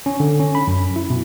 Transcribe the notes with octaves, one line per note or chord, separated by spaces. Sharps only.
C#4
D3
C#4
B5
F#2
E4
B2